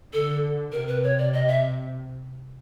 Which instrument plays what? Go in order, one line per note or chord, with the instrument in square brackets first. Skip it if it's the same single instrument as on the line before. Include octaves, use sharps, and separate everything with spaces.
[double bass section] D3 [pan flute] A4
[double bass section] C3 [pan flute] A#4
[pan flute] B4
C#5
D5
D#5
E5